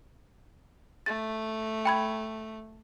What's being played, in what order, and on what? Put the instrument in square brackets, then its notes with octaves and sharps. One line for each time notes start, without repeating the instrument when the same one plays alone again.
[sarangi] A3 [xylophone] A6
[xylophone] G5 B5 G#6